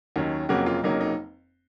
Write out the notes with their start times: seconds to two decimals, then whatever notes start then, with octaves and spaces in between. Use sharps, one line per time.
0.16 D#2 D#3 F#3 C#4
0.49 F1 F2 C#3 F#3 A#3 F#4
0.66 F4
0.83 F1 F2 C#3 F#3 A#3 D#4
1.01 D#4